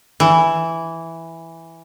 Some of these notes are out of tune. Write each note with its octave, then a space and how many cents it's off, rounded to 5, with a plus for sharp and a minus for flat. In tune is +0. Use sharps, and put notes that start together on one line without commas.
E3 +0